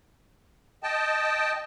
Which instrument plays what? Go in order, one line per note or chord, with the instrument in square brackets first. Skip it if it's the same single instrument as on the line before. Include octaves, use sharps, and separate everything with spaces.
[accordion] D#5 G5 A5